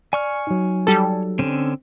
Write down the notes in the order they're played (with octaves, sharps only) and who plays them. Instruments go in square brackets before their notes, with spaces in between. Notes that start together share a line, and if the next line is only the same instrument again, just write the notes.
[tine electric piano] D5 [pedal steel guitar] G#5 C#6 F6
[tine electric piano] F#3 D#4
[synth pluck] G3 A4
[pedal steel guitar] D3 C4 C#4